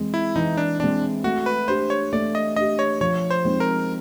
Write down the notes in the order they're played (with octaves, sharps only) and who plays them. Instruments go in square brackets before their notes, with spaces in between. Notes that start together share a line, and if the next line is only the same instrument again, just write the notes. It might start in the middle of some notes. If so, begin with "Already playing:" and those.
Already playing: [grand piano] E3 G#3 C4
[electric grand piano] E4
[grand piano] E3 [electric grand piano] D#4
[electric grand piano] D4
[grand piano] G#3 C4 [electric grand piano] D4
[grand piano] A3 [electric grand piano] F#4
[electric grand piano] B4
[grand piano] D4 G4 [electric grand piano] C5
[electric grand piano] C#5
[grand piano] A3 [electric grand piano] D5
[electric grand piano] D#5
[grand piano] D4 G4 [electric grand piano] D#5
[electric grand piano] C#5
[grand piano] F3 [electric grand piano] C#5
[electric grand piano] C5
[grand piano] G#3 C4 D#4
[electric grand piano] A#4